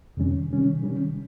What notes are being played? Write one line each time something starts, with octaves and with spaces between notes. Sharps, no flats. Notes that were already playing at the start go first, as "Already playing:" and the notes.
F2 C3 D#3 G3 C#4
C3 D#3 G3 C#4
C3 D#3 G3 C#4